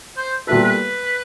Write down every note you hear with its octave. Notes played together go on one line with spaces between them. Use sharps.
C5
A#2 G3 B3 E4 A4 B4
B4